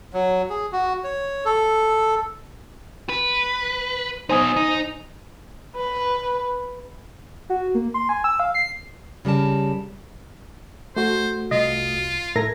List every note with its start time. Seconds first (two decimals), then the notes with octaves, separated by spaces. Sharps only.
0.13 F#3
0.50 G#4
0.72 F#4
1.04 C#5
1.45 A4
3.09 B4
4.29 B3 D#4 C5 G#5 D#6
4.56 D#4
5.76 B4
7.50 F#4
7.75 A#3
7.94 C6
8.09 G#5
8.24 E6
8.40 F5
8.55 C7
9.25 C#3 G3 A#4 A5
10.96 A3 F#4 C5
11.51 C2 F4 D#5
12.36 A2 A4 A#4 E5 G#6 A#6